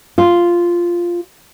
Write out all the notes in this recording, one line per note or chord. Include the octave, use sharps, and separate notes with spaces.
F4